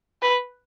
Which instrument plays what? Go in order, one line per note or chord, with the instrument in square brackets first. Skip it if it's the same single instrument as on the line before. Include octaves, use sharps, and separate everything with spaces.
[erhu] B4